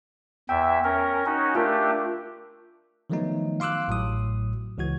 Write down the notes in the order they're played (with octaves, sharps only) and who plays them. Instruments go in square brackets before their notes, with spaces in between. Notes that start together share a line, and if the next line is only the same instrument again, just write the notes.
[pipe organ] E2 E5 [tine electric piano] G5
[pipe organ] C#4 A#4
C#4 D#4 F#4
[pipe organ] A3 D4 G4 [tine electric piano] F4 A#4
[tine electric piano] D#3 F3 F#3 A3 B3 D#4
F5 C6 D6 E6 F#6
A1 A2 F#3 D#6
C#2 E3 F#4 G#6